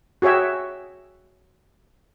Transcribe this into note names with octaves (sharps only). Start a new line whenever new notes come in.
F#4 G#4 C#5 E5 G5